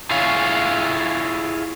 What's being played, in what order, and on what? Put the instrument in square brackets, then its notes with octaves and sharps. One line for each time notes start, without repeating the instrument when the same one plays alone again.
[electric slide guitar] E4 F4 G#4 C#5 F5